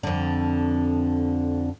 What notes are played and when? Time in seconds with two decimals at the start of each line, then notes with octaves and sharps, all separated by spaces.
0.03 F2 D3